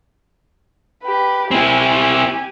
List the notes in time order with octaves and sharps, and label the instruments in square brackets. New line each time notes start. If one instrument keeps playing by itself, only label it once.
[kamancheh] G4 B4
[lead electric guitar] C4 E4 [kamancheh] G4 G#5